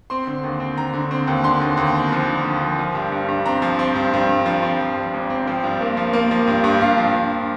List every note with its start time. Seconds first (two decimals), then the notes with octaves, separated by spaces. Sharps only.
0.10 C4 C6
0.27 D3
0.44 D#2
0.60 C4
0.77 D3 A#5
0.93 D3
1.11 C4
1.28 D#2
1.44 D3 C6
1.61 D#2
1.77 D#2
1.95 C4
2.12 F3
2.28 D3
2.45 F3
2.62 F3
2.79 F3
2.95 G2
3.12 G2
3.28 G2
3.46 C4 A#5
3.62 F3
3.79 C4
3.95 G2
4.13 G2
4.29 G2
4.46 F3
4.63 C4
4.80 F3
4.96 G2
5.14 G#1
5.30 C4
5.47 F3 G5
5.64 G2
5.81 A#3
5.97 F3
6.13 A#3
6.31 F3
6.47 G2
6.64 G2
6.81 G2 F5
6.97 F3
7.14 G2